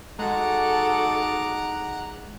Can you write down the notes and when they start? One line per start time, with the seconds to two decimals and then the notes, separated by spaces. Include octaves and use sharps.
0.19 G#3 D#4 F#4 A4 F#5 A#5 D6 F#6